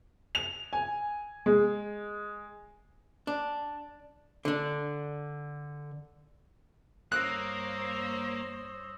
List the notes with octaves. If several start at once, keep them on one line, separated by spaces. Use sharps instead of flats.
F7
G#5
G#3
D4
D3 D4
G2 A#3 C5 C#5 D#6 E6 F#6 A#6